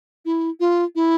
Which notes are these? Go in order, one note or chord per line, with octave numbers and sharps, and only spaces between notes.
E4
F4
E4